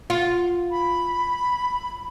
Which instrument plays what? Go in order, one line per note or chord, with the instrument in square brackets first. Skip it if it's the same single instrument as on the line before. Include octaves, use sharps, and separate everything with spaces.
[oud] F4
[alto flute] B5